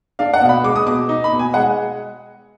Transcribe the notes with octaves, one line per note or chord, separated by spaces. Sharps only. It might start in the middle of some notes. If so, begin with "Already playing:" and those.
D4 F5
F#5
B2
B5
G#3 D6
D#6
B2 D6
D#4
B5
B2
G#5
G#3 F#5